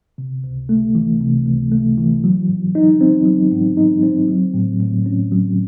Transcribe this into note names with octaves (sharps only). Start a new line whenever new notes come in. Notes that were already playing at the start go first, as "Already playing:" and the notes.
C3
C#2
A3
E3
C3
C#2
A3
E3
F#3
G#2
D#4
C4
F#3
G#2
D#4
C4
F#3
A2
A2
C#4
F#3